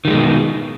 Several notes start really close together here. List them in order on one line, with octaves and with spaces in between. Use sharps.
D#3 G3 G#3 B2